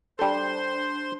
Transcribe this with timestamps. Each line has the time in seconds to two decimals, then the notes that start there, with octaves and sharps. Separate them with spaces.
0.19 G3 D4 A4 C5 C6